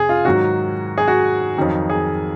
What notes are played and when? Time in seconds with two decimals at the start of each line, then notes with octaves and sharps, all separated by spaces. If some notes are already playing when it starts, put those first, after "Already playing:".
Already playing: F2 C3 F3 G#4
0.09 F4
0.25 G#2 D#3 F#3 F#4
0.98 G#4
1.08 F#4
1.57 F2 D#3 F#3
1.90 G#4